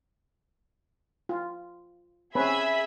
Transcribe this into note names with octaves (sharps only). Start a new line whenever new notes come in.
F4
C4 C#4 G#4 B4 E5 B5